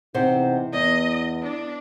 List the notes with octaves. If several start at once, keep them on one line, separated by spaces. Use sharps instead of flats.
E2 C3 D#4 E4 C5 F#5
E2 B3 D#5
D4